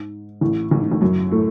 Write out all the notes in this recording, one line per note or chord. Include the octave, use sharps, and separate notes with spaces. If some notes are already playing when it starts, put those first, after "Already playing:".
Already playing: G#2
A1 A2
A1 A2
G#2
A1 A2
F#2 F#3
A2 A3